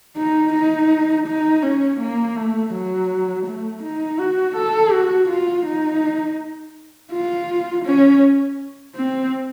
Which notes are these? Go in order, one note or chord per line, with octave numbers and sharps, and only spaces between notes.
D#4
D#4
D#4
C#4
A#3
A3
F#3
A3
D#4
F#4
A4
F#4
F4
D#4
F4
C#4
C4